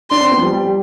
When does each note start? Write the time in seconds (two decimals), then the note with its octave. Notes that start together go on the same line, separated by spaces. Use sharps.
0.10 D4 C6
0.21 C4
0.32 B3
0.38 F3
0.42 G3
0.53 G3
0.67 G3